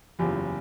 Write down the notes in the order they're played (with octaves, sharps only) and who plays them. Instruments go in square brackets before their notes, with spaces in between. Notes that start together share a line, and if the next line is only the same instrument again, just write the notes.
[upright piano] F#1 E2 C#3 F3 G4